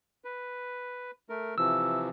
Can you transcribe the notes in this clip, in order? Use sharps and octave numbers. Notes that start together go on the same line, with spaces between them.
B4
A3 A#4
C3 E3 F3 E6